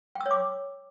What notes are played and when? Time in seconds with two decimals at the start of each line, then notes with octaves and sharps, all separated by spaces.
0.15 G5
0.21 E6
0.26 C#5
0.31 D6